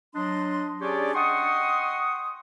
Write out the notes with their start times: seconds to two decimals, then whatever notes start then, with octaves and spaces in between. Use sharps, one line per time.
0.15 F#3 D4 D#5 C6
0.81 C#4 D4 G4 G#4 C#5 D5
1.15 D#5 F#5 G5 C6 C#6 D#6